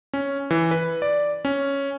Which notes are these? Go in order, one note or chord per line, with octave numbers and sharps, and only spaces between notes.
C#4
E3
B4
D5
C#4